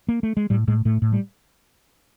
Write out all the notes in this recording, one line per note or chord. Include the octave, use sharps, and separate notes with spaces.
A#3
A3
G#3
A2 G3
A2 G#3
A2 A3
A2
G3